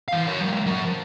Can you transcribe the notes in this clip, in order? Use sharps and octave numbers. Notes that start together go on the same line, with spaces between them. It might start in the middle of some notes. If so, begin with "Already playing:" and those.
E3 F5
A#4 C#5
F#3 G#3
F#3 A#4
F3